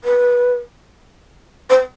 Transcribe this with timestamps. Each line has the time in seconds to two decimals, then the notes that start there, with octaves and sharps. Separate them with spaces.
0.04 B4
1.70 C5